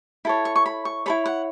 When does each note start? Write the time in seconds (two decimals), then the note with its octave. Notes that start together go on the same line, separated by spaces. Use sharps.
0.25 E4 A4 C#5 B5
0.45 C#6
0.56 C#6
0.66 B5
0.85 C#6
1.06 E4 A4 C#5 B5
1.26 F#5